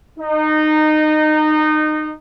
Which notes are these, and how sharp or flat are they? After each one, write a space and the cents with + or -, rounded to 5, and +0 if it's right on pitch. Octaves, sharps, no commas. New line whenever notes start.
D#4 -20